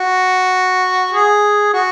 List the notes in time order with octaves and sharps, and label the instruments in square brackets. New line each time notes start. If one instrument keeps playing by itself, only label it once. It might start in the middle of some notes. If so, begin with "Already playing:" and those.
Already playing: [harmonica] F#4
G#4
F#4